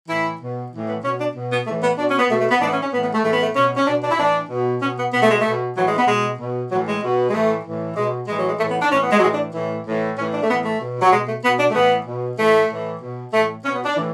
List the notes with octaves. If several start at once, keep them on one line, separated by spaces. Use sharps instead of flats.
A2 E3 E4
B2
A2 E3
B3
B2 C#4
D4
B2
B3
A2 E3 A3
B3
B2 D4
C#4
B3
B2 A3
A3
B3
A2 E3 D4
B3
C#4
C#4
A2 E3 B3
B3
A3
A2 E3 A3
B3
A3
B2 C#4
C#4
B2 D4
D4
E4
A2 E3 D4
B2
B2 C#4
B3
B2 B3
A3
G#3
A3
B2
A2 E3 F#3
G#3
B3
B2 G#3
B2
A2 E3 F#3
G#3
B2
G#3
A2 E3 A3
A2 E3
B2 G#3
A2 E3 G#3
F#3
G#3
A2 E3 A3
B3
D4
A2 E3 C#4
B3
G#3
F#3
A2 E3 G#3
D4
A2 E3
A2 E3
A2 E3 C#4
D4
A3
A2 E3 B3
A3
B2
F#3
B2 G#3
A3
B2 B3
D4
A3
A2 E3 B3
B2
A2 E3 A3
A2 E3
B2
A2 E3 A3
B2 C#4
B3
D4
A2 E3